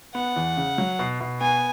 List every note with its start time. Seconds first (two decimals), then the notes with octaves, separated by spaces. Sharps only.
0.14 B3 F#5
0.36 E2
0.57 C#3
0.78 F#3
0.99 B2
1.20 B2
1.41 B3 G#5